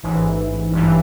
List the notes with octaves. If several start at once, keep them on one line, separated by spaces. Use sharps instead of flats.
A1 G#2 E3
A1 G2 E3